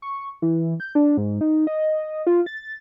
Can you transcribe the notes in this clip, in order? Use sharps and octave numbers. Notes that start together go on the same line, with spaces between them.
C#6
E3
G6
D4
G#2
D#4
D#5
F4
A6